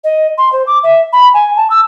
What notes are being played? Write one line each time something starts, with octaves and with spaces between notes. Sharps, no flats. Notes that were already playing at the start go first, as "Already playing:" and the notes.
D#5
C6
C5
D6
E5
B5
G#5
A5
E6